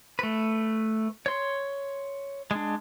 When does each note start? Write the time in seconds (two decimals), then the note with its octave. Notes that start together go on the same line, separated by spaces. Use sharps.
0.19 A3 B4
1.26 C#5 C6
2.51 G#3 D4